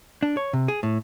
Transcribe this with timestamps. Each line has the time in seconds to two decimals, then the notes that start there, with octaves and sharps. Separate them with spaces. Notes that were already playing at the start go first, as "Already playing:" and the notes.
0.23 D4
0.37 C#5
0.53 C3
0.68 G#4
0.83 A2